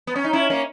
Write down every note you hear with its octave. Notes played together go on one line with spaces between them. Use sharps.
B3
C#4
D#4
C#4 E4
A#3 C#4